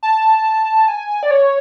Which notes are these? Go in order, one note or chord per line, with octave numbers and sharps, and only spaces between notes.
A5
G#5
D5
C#5